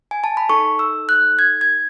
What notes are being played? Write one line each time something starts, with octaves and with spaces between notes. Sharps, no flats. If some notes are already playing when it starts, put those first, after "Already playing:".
G#5
A5
B5
D#4 A4 C#6
E6
F#6
G#6
G#6